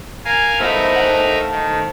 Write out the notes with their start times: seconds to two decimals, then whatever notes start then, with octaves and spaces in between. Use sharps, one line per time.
0.25 A#4 F5 G#5
0.60 A3 B3 D#4 A#4 C5 E5 F5
0.95 A3 F#5
1.51 D#3